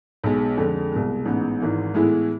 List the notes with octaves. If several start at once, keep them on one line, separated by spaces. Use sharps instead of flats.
B1 B2 G#3
F2 D3 G#3
C2 B2 G#3
A1 G#2 G#3 B3
G#1 G#2 E3
A2 E3 G#3 B3 E4